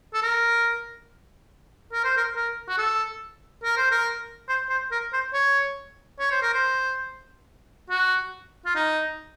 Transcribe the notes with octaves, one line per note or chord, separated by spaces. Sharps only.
A4
A#4
A#4
C5
A#4
A#4
F#4
A4
A#4
C5
A#4
C5
C5
A#4
C5
C#5
C#5
C5
A#4
C5
F#4
F4
D#4